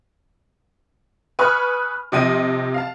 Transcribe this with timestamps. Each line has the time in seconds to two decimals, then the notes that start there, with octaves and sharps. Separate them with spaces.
1.39 B4 G#5 B5 C#6 D#6 F6
2.12 C3 F3 D#5 G5 D#7
2.74 F5 A5